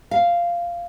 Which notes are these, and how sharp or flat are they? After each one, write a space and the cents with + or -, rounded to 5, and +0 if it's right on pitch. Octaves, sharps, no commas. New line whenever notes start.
F5 -10